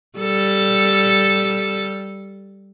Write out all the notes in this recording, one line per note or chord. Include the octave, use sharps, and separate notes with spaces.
G3 A4